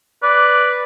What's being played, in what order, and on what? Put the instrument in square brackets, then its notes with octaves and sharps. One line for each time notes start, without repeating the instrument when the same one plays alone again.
[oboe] B4 [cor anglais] D5